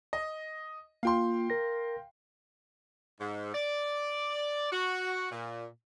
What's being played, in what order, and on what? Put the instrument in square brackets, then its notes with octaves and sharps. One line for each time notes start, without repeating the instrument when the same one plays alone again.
[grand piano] D#5
[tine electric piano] A#3 F4 [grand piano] F5 G5 C6
[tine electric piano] A#4 A#6
[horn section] G#2
D5
F#4
A#2